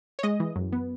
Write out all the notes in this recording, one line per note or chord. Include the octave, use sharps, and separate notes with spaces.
C#5
G#3 D#5
E3
F#2
B3